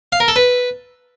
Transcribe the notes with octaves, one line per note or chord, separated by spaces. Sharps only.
F5
A#4
A4
B4